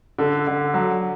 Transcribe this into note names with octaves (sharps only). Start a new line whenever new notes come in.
D3 A4
D3
F#3